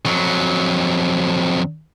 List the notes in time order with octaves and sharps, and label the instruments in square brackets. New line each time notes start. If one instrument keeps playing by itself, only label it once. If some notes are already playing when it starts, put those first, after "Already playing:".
[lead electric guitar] F2 F#3